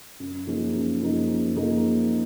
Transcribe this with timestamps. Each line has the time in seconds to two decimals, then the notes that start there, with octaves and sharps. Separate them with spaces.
0.20 F#2
0.47 F3 A#3 D#4 G#4
0.74 F#2
1.02 F3 A#3 D#4 G#4
1.28 F#2
1.56 F3 A#3 D#4 G#4